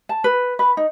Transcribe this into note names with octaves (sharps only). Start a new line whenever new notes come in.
A5
B4
B4
D#4